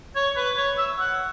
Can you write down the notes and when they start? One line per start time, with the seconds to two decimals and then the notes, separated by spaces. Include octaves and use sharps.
0.15 C#5
0.36 B4
0.57 C#5
0.78 E5
0.99 F#5